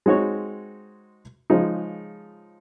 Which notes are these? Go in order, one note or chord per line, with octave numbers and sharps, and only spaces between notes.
G#3 C4 D#4 F#4 C#5
C#3 F3 G#3 D#4